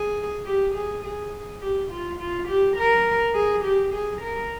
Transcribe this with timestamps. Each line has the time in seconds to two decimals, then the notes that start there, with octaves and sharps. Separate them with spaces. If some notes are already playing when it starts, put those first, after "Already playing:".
Already playing: G#4
0.45 G4
0.74 G#4
1.04 G#4
1.61 G4
1.91 F4
2.19 F4
2.48 G4
2.77 A#4
3.35 G#4
3.64 G4
3.93 G#4
4.22 A#4